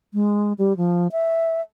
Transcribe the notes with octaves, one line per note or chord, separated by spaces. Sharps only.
G#3
G3
F3
E5